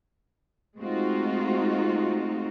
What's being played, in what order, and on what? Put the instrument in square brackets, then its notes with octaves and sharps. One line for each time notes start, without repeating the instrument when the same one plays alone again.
[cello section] G#3 A3 C4 D#4 F4 F#4